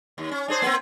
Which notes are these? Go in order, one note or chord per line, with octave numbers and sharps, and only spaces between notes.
D#2
C#4
D4 G#4 C5
A#3 C4